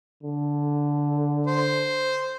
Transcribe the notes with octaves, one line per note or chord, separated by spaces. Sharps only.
D3
C5